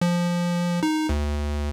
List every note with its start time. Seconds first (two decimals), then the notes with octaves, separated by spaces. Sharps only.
0.01 F3
0.83 D#4
1.09 D2